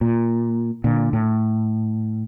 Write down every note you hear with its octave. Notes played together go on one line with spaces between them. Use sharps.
A#2
A#2 D3
A2